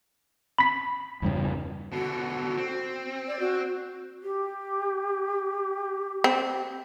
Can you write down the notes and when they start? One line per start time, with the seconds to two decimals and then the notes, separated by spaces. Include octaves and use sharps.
0.59 B5 B6
1.22 E2 G2 C#3
1.92 B2 D3 F#4
2.57 C4
3.28 D5
3.40 F#4
4.23 G4
6.24 C4